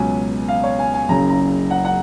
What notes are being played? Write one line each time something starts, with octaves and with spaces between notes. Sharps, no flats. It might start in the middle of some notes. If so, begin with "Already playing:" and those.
Already playing: C#2 B2 F#3 C#4 G#5
F5
C#5
G#5
G#5
F#1 F#2 C#3 A#5
A#5
F#5
F#5